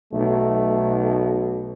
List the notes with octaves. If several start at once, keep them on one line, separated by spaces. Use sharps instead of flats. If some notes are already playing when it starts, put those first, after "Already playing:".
B1 A3